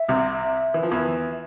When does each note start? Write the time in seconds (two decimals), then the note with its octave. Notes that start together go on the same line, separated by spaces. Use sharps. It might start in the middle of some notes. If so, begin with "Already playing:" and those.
Already playing: E5
0.09 C2 C3
0.74 E3
0.83 F3
0.91 E2 E3